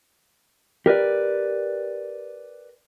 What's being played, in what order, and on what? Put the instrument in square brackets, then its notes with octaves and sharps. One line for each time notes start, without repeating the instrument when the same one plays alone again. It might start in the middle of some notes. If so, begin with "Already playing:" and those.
[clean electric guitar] G4 A#4 B4 D5